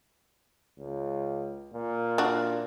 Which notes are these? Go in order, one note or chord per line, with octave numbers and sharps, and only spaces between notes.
C#2
A#2
D4 F#4